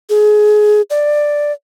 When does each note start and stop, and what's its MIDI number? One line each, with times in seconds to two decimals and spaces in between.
0.10 0.82 68
0.90 1.52 74